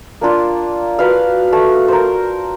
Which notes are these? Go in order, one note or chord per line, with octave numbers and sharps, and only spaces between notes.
A#3 D4 F4
F#4 B4 F5
A3
A#4 C5